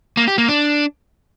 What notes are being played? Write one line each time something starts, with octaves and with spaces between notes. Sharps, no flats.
A#3
G4
A#3
D4